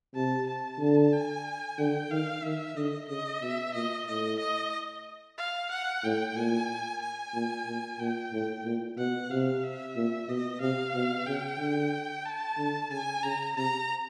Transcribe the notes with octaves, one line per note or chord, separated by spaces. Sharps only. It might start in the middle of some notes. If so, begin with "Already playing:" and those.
C3 A5
A5
D3
G#5
D3 G5
D#3 F5
D#3 E5
D3 D#5
C#3 D#5
B2 E5
A#2 D#5
A2 D#5
D#5
F5
F#5
A2 G5
A#2 G#5
G#5
A#2
A#2
A#2 G5
A2
A#2
B2 F#5
C3 F5
E5
A#2
B2 D#5
C3 F5
B2
C#3 G5
D3
A5
D3
C#3 G#5
C#3 A#5
C3 A#5